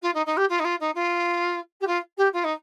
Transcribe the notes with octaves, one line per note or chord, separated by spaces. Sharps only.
F4
D#4
D#4
G4
F4
D#4
F4
D#4
F4
G4
F4
G4
F4
D#4